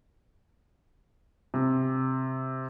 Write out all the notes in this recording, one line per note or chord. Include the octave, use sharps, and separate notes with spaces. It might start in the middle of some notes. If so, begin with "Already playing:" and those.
C3